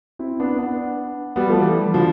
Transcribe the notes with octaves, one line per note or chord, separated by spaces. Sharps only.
C4 E4
B3 D4
B3 D4
G3 B3
F3 A3
E3 G3
D3 F3